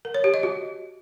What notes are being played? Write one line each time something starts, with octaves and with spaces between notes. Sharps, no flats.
A#4
C#5
G4
D#5
F#4